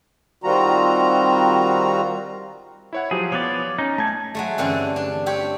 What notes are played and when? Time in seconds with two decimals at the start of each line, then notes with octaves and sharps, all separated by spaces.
0.44 D#3 G3 C4 F4 F#4 A#5
2.93 E4 C#5 F#5
3.11 F3 F#3 G4 G#4
3.32 F3 B3 C#5 D5
3.78 C#4 D#4
3.98 A3 G#5 A5 A6
4.35 F#3 G#3 A3
4.58 G2 D3 E3 C4 C#4
4.96 D4
5.26 C4 G4 C#5